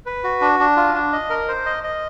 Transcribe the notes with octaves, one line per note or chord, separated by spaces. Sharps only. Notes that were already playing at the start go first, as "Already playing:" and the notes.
B4
F#4
D4
D4
F4
D4
D#5
A#4
C5
D#5
D#5